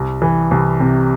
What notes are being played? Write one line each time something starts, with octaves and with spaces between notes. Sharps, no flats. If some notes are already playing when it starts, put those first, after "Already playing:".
Already playing: C2
E3
C2
C3